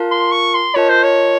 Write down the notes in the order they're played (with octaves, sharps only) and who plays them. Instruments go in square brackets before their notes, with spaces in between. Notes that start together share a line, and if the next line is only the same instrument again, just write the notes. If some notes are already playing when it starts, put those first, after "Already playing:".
Already playing: [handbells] F4 A#4 F5 A5
[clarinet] C6
C#6
C6
[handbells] F4 A#4 D#5 A5 [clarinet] C#5
[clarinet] C5
C#5